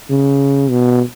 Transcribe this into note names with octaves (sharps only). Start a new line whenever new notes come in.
C#3
B2